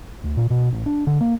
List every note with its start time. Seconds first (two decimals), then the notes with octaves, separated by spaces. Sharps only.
0.24 D2
0.37 A#2
0.50 B2
0.73 A1
0.86 D4
1.07 D3
1.21 A#3